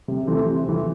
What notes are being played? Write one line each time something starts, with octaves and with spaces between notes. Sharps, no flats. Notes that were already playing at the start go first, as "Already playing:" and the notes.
C3
E3 A3 C4
C3
E3 A3 C4